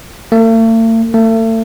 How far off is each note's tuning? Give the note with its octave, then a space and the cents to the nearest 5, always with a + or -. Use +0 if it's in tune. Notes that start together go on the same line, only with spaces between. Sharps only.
A3 +45
A3 +35